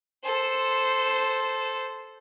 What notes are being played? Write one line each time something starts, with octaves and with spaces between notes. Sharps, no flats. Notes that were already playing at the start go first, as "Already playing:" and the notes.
A4 C5